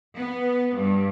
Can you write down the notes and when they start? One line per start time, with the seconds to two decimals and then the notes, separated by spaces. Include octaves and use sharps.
0.17 B3
0.77 G2